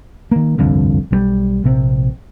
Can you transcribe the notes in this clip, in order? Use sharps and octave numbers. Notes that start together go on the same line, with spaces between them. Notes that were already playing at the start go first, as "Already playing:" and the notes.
D#3 A#3
G1 C2 F2 D3
B1 E3 G3
A#1 C3 C4